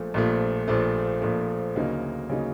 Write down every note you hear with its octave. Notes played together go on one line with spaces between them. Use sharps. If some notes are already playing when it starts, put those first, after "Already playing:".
Already playing: A#1 A#2 F3 A3
A#1 A#2 F3 A3
A#1 A#2 F3 A3
A#1 A#2 F3 A3
D2 C#3 F#3 A#3 D#4
C#3 F#3 A#3 D#4